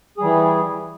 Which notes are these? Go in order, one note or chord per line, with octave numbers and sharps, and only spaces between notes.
E3 G3 G#4